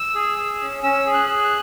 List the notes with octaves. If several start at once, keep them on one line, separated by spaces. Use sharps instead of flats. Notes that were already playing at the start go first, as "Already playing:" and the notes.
Already playing: E6
G#4
G#4
C#4
C#4 E6
G#4
F#6
G#4
F#6